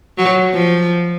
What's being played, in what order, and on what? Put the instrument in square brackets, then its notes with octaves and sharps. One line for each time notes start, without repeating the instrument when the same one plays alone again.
[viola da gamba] F#3
F3